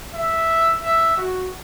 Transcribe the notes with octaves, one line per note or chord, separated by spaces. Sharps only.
E5
E5
F#4